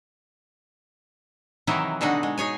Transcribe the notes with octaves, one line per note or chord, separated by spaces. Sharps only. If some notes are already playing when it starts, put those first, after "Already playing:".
C3 D#3 E3 F#3 D#4 E4
B2 D3 G#3 D#4 F#4
G#3
D#4 G#4 C#5 G#5